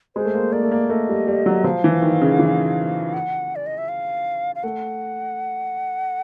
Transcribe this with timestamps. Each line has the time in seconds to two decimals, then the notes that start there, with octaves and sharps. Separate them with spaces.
0.16 G#3 C5
0.25 A3
0.34 A#3
0.52 A#3 D5
0.63 A3
0.71 A#3
0.90 A3 D#5
1.09 G3
1.27 G3
1.46 F#3
1.64 F3 F5
1.84 E3
2.02 D#3
2.21 C#3
2.39 E3
3.14 F#5
3.56 D5
3.66 D#5
3.78 E5
3.89 F5
4.55 F5
4.63 A3 F#5